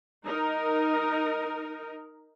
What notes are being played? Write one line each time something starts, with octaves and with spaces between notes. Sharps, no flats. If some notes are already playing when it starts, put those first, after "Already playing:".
D#4 A#4